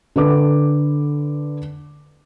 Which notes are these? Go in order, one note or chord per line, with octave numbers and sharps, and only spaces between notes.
D3 A4 B4 D6